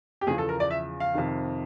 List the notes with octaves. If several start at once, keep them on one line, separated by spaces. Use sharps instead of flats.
G4
E2 C#3 F3 G#4
A4
A#4
D5
E5
F5
F2 C3 D#3